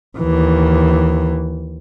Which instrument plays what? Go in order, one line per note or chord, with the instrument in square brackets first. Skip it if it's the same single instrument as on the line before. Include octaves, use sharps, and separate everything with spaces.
[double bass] D#2 E3